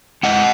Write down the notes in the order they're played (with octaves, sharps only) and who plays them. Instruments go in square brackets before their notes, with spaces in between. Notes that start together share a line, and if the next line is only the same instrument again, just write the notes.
[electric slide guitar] G#3 D#5 F#5